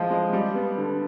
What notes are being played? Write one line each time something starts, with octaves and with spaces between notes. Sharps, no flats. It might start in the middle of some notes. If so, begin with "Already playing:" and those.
Already playing: F3 G#3 E4
G#3
G3
B3
D3